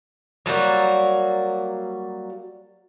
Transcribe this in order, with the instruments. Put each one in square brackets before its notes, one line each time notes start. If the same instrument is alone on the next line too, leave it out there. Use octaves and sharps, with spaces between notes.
[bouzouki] F#3 G3 A#3 F#4